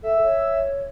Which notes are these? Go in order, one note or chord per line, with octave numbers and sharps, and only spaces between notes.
A4 E5
C#5